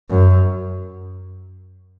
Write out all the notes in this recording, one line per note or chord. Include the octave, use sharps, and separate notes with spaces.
F#2